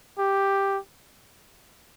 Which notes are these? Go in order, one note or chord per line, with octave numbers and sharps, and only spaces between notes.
G4